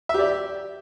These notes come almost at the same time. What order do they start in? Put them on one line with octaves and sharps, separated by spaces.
E5 G4 D5